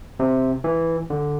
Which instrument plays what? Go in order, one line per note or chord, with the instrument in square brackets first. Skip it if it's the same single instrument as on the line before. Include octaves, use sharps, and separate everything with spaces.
[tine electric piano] C3
E3
D3